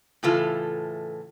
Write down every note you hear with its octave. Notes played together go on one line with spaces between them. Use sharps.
A2 C#3 E3 F4 A4